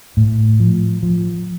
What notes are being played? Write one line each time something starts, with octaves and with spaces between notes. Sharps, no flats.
A2
F3
F3